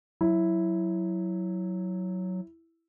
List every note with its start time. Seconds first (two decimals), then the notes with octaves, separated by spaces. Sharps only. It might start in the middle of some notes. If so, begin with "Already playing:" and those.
0.21 F#3 E4